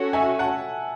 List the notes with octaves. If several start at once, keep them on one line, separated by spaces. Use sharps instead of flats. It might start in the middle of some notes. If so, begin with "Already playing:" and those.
Already playing: C#4 F#4 A4 C#5
E5 G#5
F#5 A5